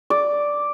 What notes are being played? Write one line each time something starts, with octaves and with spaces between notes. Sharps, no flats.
D5